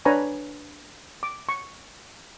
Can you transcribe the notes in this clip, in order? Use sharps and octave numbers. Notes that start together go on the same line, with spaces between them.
D4 B4 C#5 G#5 A#5 C#6
D6
C#6